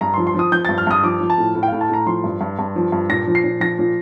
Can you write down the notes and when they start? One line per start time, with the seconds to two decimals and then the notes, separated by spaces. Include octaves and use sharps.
0.01 G2 A#5
0.14 F3 C6
0.27 C6
0.34 F3 D#6
0.52 F3 G6
0.65 G2 A6
0.78 F6
0.87 G2 D#6
1.03 F3 D6
1.20 F3
1.30 A5
1.38 A2
1.55 A2
1.63 G5
1.68 A2 F5
1.81 A5
1.89 A2 A#5
2.06 F3 C6
2.24 G2
2.41 G2
2.59 G2
2.76 F3
2.92 G2
3.09 A#2 A#6
3.27 F3
3.35 C7
3.44 A#2
3.60 F3 A#6
3.79 A#2